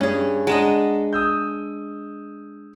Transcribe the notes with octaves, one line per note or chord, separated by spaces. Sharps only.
G2 C#4 G#4
G#3 D4 D#5 F#5 A#5 E7
D#6 E6 G6